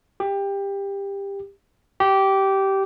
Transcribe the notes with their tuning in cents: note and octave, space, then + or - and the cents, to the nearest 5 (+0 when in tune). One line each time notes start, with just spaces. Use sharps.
G4 +20
G4 -15